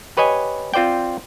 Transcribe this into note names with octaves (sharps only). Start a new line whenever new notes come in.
G4 B4 C#5 D#5 G#5
C4 F4 C5 D5 G5